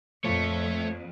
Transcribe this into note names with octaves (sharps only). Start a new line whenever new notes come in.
F2 A#2 F3 A3 C#5